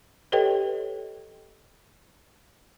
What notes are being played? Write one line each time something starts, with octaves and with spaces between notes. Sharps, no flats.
G4 A4 B4 C#5 D#5 G5